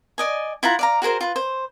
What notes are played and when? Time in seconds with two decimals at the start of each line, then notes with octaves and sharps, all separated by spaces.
0.18 D5 D#5 G#5
0.63 E4 F4 F#5 A#5
0.79 D5 F5 A#5
1.02 F#4 G#4 A#4 C5
1.21 F4 B4
1.36 C5